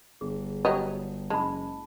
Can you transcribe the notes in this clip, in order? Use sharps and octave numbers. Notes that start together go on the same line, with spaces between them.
G1 G#4
F#3 G4 D#5
F#1 G#3 A5 B5